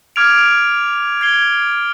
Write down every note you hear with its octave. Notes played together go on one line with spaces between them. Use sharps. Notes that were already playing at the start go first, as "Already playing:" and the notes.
D6 F6 G#6 D7 F7
G#6 C7 G7